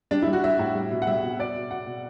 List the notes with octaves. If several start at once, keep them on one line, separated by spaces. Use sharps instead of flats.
G3 D4
E4
G3
F#4
G3 E5
A2
G3
B2
F#5
G3 E5
B2
B2 D5
B2
B2 F#5
B2